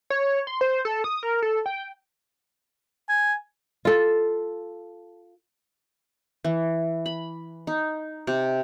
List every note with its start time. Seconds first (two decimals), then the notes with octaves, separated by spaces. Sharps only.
0.10 C#5
0.47 C6
0.61 C5
0.85 A4
1.04 D#6
1.23 A#4
1.42 A4
1.66 G5
3.09 G#5
3.85 F4 A4
6.44 E3
7.06 B5
7.67 D#4
8.27 C3